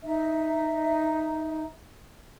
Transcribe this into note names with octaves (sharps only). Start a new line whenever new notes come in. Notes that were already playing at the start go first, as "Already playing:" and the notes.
D#4 E5